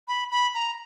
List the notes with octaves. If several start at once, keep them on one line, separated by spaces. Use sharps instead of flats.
B5
B5
A#5